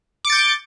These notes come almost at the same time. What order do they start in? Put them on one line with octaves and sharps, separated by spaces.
D6 C#7 A6 G6